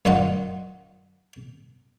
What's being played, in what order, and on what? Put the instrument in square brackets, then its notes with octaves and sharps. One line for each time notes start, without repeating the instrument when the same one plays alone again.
[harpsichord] F#2 D#4 F4 D#5 F#5